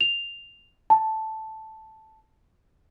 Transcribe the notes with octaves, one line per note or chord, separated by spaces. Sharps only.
F7
A5